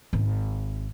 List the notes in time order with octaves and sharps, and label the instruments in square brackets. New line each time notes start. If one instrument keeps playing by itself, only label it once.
[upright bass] G#1